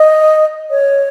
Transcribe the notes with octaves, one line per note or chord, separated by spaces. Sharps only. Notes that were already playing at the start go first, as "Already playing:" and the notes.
Already playing: D#5
C#5